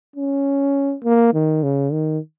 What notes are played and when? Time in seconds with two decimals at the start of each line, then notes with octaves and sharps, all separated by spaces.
0.16 C#4
1.04 A#3
1.34 D#3
1.63 C#3
1.92 D#3